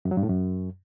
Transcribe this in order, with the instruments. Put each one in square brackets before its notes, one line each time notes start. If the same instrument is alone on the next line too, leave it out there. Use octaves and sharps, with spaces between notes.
[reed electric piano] F#2
F#3
G2
A2
F#2